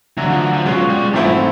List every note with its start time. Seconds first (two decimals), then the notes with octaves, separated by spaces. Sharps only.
0.17 D3 E3 F#3 A3
0.30 F3
0.41 E3
0.53 F3
0.65 B2 F#3 G#3 C#4 F4
0.89 G3
1.13 G#2 E3 F3 A3 C4 E4